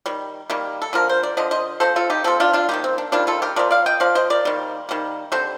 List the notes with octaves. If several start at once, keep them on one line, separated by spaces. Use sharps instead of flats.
D#3 G3
D#3 G3 A#3
A4
D3 F3 A#3 A#4
C5
D5
D3 F3 D#5
C5 D#5
F3 C4 A4 C5
F4 A4
D#4 G4
F3 C4 F4 A4
D4 F4
D4 F4
D#3 G3 A#3 D#4 G4
C4
D4
D#3 G3 A#3 D4 F4
F4 A4
G4 A#4
F3 C4 A#4 D5
D5 F5
D#5 G5
F3 C4 D5 F5
C5 D#5
A#4 D5
D#3 G3 A#3
D#3 G3 A#3
D3 G3 C4 A4 C5